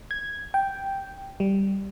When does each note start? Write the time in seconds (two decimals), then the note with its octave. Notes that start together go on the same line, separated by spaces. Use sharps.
0.11 G#6
0.54 G5
1.40 G3